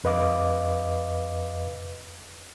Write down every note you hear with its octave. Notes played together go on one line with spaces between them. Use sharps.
F2 B4 D#5 F5 D6